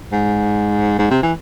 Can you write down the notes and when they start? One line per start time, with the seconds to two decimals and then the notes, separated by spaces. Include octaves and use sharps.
0.12 G#2
0.99 G#2
1.11 C3
1.23 E3